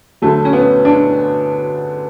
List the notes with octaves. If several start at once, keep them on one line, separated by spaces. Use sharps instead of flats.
D2 D3 F#3 A3
C#4
B3
D4